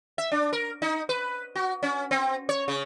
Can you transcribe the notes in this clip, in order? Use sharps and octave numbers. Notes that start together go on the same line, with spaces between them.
E5
D4
A#4
D#4
B4
F#4
C#4
C4
C#5
C#3